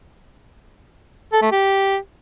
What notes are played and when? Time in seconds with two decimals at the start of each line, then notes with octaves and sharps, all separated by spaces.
1.33 A4
1.42 A3
1.52 G4